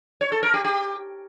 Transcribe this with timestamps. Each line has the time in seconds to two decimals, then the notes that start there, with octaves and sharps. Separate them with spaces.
0.21 C#5
0.32 A4
0.43 A#4
0.54 G4
0.65 G4